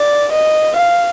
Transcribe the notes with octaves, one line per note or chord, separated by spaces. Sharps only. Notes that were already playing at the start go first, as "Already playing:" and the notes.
Already playing: D5
D#5
F5